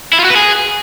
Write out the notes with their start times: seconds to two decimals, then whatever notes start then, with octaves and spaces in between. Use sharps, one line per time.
0.13 E4
0.19 F4
0.24 F#4
0.30 B4
0.36 G#4